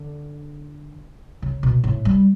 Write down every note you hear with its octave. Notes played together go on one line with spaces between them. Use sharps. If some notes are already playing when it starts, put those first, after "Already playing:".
Already playing: D3
C#3
B2
A2
G3